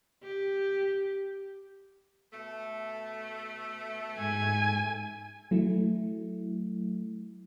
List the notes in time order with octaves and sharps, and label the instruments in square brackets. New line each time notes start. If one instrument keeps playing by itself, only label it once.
[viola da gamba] G4
[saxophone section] B2 A3
[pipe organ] G#2 [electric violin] G#5
[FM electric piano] F#3 A3 E4